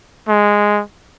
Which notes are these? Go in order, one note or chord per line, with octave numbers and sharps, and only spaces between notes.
G#3